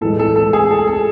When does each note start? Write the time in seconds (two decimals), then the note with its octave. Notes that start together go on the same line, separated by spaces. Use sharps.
0.01 A2 E3 G#3 A4
0.19 A4
0.36 A4
0.53 G#4
0.71 A4
0.88 A4